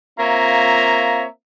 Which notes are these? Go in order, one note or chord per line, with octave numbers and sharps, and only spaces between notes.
A#3 C4 F4 C#5 E5 A#5